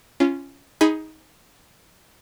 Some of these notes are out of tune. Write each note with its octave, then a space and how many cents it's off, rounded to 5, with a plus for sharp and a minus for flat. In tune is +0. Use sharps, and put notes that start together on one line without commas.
C#4 +0 F4 -25
D#4 +20 G#4 +0 B5 +5